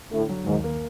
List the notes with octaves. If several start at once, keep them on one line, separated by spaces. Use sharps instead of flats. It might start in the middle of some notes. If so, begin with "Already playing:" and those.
A2 D3
F#3
D#2 G#2
A#3